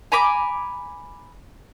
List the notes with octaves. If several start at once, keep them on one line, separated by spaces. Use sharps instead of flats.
G#5 A#5 B5 D6